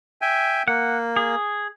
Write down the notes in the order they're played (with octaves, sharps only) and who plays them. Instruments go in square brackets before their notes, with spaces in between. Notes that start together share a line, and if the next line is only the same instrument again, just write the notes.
[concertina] E5 G5 G#5
[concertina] A#3 [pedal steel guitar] F#5
[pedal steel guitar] G#4